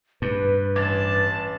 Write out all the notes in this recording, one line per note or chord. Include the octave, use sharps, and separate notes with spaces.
G2 B4
A1 B4 A5 D6 G#6